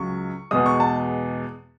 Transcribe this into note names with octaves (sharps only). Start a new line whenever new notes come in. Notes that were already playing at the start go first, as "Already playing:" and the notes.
Already playing: C#2 C#3 F#3 C#6
E2 B2 G#3 D#6
C#6
A5